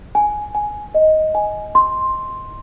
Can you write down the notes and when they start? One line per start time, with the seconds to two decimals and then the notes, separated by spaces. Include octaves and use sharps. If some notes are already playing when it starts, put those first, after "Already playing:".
0.15 G#5
0.55 G#5
0.94 D#5
1.35 G#5
1.75 C6